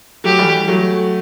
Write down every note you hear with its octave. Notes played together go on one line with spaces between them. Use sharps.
F#3 A3 G4
E3 G3
F#3 A3